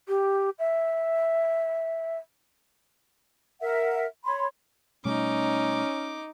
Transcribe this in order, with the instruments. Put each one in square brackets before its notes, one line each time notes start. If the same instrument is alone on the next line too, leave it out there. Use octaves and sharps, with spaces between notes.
[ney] G4
E5
[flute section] A#4 E5 F#5
C#5 B5 C6
[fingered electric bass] B2 G3 A3 [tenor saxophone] C#4 [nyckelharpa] D#4 D6